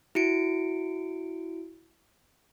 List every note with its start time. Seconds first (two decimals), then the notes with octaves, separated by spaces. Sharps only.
0.15 E4 F#4 C#7 D7